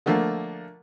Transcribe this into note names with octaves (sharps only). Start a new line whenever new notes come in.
D3 F3 A3 A#3